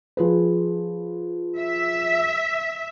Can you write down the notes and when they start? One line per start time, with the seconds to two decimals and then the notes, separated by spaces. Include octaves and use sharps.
0.17 F3 G#4 B4
1.59 E5